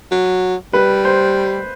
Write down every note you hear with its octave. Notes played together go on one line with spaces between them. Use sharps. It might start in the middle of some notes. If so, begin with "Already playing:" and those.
F#3
G3 B4
C5